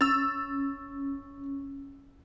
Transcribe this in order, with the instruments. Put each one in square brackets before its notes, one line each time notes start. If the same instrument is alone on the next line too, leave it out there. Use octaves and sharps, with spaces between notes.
[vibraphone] C#4 [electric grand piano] E6 A6